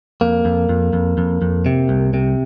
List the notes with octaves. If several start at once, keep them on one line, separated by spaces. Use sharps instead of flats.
F2 A#3
F2
F2
F2
F2
F2
C3
C2
C3